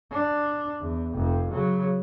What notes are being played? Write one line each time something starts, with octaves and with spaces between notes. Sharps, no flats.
D4
E2
F1 F2
C#3 F#3